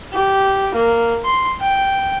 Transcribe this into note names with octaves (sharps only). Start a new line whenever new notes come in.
G4
A#3
C6
G5